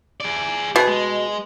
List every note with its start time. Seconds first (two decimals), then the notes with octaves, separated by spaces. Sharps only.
0.20 G#4 D5
0.76 B2 G#4
0.87 G#3